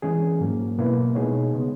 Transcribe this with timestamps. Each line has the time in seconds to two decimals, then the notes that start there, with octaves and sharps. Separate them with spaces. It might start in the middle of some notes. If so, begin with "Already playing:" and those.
0.02 E3 G#3 C#4 G#4
0.40 G#2 F#3 A#3
0.78 B2 A#3 E4 B4
1.15 B2 G#3 D#4 G#4 C#5
1.53 C#3 G#3 B3